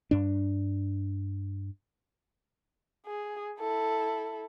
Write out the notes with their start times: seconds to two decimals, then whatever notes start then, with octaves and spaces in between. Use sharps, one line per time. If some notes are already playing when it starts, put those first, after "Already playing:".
0.11 G2 D4
3.06 G#4
3.60 E4 A4